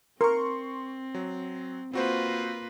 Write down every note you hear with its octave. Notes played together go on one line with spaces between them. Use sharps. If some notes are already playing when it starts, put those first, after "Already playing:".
C4 A#4 C6 C#6
F#3
A#3 C4 F4 F#4 B4 C5